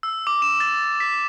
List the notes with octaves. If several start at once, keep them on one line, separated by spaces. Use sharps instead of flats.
E6
D6
E7
A6
B6